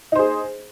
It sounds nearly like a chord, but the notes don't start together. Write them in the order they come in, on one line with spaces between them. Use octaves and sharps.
D#4 C5 G#4